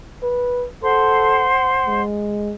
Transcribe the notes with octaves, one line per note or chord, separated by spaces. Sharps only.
B4
A4 C5 F#5 C6
G#3